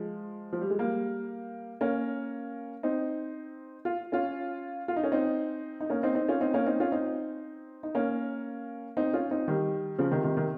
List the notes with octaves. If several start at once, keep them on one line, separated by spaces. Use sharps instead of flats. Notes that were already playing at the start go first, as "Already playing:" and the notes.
Already playing: F3 G#3
F3
G3
G#3
G3 A#3
A#3 C#4
C4 D#4
F4
C#4 F4
F4
D#4
C#4
C4 D#4
D#4
A#3 C#4
C4 D#4
C4 D#4
C#4 F4
C4 D#4
A#3 C#4
C4 D#4
C#4 F4
C4 D#4
D#4
A#3 C#4
C4 D#4
C#4 F4
C4 D#4
D#3 G3
C#3 F3
C3 D#3
C3 D#3
C3 D#3